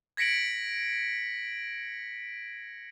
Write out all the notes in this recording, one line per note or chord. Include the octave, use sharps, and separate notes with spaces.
G#6 A#6 B6 C#7 D7 F#7